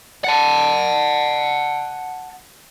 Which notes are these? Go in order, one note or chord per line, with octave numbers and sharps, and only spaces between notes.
F#5 A5